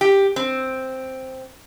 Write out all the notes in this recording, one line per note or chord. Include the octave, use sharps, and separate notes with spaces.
G4
C4